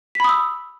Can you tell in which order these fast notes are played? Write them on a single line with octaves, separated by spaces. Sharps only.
B6 B5 D#6 E6